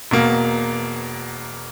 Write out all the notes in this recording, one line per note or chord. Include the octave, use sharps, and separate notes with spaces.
E1 B2 A#3